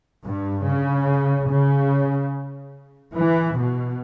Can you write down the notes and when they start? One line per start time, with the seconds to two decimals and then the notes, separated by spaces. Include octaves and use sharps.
0.24 G2
0.65 C#3
1.48 C#3
3.14 E3
3.55 B2